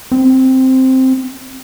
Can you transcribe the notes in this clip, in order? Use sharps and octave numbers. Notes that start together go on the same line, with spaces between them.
C4